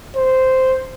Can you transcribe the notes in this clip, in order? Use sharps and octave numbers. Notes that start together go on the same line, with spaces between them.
C5